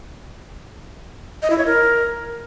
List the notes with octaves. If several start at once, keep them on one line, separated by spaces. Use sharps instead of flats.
D#5
E4
C#5
A#4